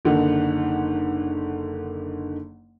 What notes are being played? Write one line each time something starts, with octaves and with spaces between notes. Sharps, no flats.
F#1 D3 D#3 F#5